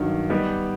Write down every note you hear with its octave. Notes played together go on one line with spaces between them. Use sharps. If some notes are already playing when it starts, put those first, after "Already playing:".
Already playing: G2 D#3 F#3
G3 B3 D#4 G4